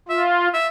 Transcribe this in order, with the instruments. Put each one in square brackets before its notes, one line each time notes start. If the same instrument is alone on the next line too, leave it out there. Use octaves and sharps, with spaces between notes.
[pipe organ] F4 [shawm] E5
[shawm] E5